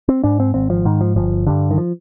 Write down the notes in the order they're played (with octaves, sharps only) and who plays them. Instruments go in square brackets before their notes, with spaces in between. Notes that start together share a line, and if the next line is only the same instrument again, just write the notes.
[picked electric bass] C4
G#2 D4
C4
G#1 C4
F3
G#2 D#3
F3
G1 F3
G2 D3 G3
D#3
F3